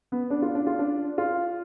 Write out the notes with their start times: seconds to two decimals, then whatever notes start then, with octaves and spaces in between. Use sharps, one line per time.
0.12 B3
0.30 D4
0.42 F4
0.55 D4
0.67 F4
0.79 D4
1.18 F4